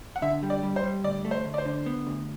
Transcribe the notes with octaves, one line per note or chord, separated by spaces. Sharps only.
F#5
D3 E5
G3
D5
G3
C5
G3
D2 D5
A3
C5
D2
D5
C5
D3
B3
D2